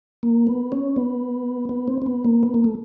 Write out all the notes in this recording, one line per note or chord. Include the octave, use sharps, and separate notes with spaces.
A#3
B3
C#4
B3
B3
C4
C4
B3
A#3
B3
A#3
A3